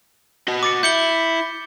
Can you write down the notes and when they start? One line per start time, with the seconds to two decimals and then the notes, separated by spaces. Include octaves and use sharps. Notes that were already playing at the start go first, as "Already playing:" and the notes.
0.48 F#4 D#5
0.63 D6 A6 C#7
0.83 E4 G6 C#7 G7